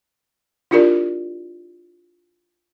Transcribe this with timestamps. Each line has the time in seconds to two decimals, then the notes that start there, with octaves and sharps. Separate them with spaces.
0.71 D4 E4 F4 G4 A#4 D5